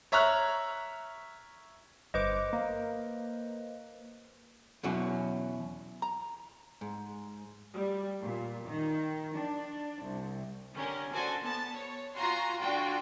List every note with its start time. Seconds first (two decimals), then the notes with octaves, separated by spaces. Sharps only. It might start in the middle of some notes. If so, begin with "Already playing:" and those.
0.12 C#5 E5 A#5 C#6 F6 F#6
2.14 G1 B4 C5 D#5 D6
2.53 A#3
4.83 E2 B2 F#3 C#4 F#4
6.02 A#5
6.81 G#2
7.74 G3
8.23 A#2
8.65 D#3
9.35 D4
10.01 C2
10.75 D3 C#4 G4 A#4
11.13 F#4 A4 C5 D5 G#5
11.43 B3 A5
11.74 C#5
12.16 F4 F#4 G#5 A#5 C6
12.60 D3 F4 F#4 G5